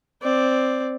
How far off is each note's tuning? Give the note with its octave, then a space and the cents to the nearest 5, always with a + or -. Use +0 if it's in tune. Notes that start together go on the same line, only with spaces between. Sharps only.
C4 +0 D5 +0